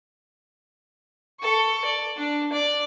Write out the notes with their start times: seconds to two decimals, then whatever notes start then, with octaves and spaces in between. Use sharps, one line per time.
1.40 A4 C#6
1.85 D5
2.18 D4
2.53 D5